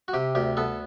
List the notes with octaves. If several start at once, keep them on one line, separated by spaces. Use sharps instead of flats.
F#4
C3 G4
D2 G4
B3 A4